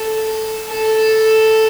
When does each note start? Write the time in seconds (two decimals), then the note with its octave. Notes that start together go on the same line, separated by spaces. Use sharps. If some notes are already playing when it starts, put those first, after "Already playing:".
Already playing: A4
0.69 A4